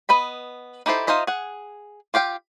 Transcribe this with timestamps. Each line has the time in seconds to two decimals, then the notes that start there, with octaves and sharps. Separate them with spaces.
0.09 B3 B4 D#5 B5
0.86 D#4 E4 G4 A4 C5
1.07 D#4 F4 C5 D#5 E5
1.27 G#4 F#5
2.14 F4 G4 F5 G5